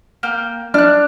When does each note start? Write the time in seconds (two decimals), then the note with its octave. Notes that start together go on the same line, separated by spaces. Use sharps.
0.23 A#3 G5 F6
0.74 D4 F6 F#6